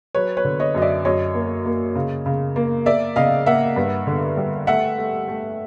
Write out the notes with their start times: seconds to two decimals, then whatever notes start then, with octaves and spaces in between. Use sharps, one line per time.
0.15 F#3 B4 C#5
0.37 B4 C#5
0.44 D3
0.60 C#5 D#5
0.75 F#2 D#5
0.82 D5 E5
1.05 F#2 C#5 D#5
1.35 A#3
1.66 A#3
1.95 C#3
2.26 C#3
2.56 A#3
2.86 A#3 D5 E5
3.16 C#3 D#5 F5
3.46 A#3 E5 F#5
3.76 G2
4.07 D3
4.37 G3
4.67 A3 E5 F#5
4.98 A3
5.28 A3